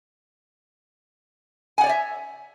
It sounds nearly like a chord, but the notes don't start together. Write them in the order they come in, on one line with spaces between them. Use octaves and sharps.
G#5 F#5 D5 C#5 E5